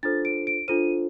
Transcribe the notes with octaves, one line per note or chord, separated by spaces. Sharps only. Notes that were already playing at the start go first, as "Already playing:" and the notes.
D4 F4 A4 C5 A6
D7
D7
D4 F4 A4 C5 D#7